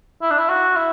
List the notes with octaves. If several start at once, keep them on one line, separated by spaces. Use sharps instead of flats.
E4
D4
E4
F#4
E4